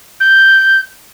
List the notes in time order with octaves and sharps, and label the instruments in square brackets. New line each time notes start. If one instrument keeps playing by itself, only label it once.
[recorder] G6